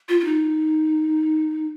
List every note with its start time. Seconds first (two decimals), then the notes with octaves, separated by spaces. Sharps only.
0.09 F4
0.21 F4
0.25 D#4